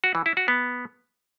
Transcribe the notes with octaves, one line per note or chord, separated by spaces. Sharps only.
F#4
E3
E4
F#4
B3